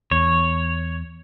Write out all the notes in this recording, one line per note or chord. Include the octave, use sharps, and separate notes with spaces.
E2 C#5